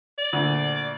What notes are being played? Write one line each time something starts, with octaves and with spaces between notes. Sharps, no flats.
D5
D2 A#2